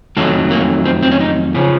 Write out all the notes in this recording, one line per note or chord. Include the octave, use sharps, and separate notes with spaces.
F2 D#3 F#3 A3 A4
A#3
C4
C4
C#4
D#4
C#3 F3 C#4